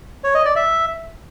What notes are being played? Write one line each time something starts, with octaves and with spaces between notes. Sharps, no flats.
C#5
D#5
D5
E5